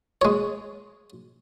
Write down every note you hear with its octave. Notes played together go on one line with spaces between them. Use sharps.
G#3 C#5